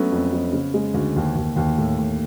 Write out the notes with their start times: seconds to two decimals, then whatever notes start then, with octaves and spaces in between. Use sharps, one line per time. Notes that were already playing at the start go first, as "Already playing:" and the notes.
Already playing: F#3 A3 B3 C#4
0.12 F2
0.32 F2
0.53 C#3
0.74 G#3
0.94 D2
1.16 D#2
1.36 D#2
1.56 D#2
1.78 A2
1.99 A2